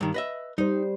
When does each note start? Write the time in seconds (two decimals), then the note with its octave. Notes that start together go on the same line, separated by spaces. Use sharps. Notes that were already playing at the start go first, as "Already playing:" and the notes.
0.01 G2 D#3
0.14 B4 D#5 E5
0.58 G3 D#4 C5